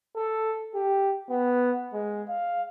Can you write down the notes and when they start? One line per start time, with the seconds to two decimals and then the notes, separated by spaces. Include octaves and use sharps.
0.16 A4
0.75 G4
1.30 B3
1.93 G#3
2.29 F5